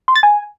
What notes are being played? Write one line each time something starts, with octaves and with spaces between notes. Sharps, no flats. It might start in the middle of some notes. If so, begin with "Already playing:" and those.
C6
A6
G#5